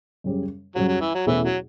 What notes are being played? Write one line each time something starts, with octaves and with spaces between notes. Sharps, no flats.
F#2 C#3 G3 C#4
F#2 C#3 F#3 G3 C#4
F#3
E3
F#3
E2 B2 E3 A3 C#4 E4
F#3